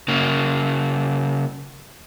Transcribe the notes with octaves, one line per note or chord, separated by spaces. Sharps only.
C#3 A#3